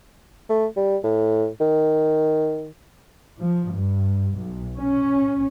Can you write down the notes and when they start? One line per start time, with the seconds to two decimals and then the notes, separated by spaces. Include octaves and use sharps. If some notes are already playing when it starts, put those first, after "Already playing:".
0.49 A3
0.76 G3
1.04 A2
1.61 D#3
3.39 F3
3.72 G2
4.36 B1
4.78 C#4